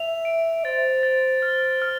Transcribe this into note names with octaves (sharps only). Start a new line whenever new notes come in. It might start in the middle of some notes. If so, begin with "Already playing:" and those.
Already playing: E5 F7
D7
C5 A6
A6
F6
F6